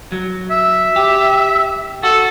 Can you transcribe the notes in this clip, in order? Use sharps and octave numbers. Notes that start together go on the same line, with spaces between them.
F#3
E5
G4
F#4 A4